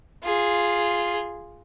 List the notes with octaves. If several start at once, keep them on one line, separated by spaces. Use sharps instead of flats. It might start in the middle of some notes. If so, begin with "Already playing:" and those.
F4 G#4